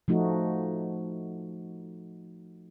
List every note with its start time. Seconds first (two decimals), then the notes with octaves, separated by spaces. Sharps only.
0.08 F3 A3 D#4 F#4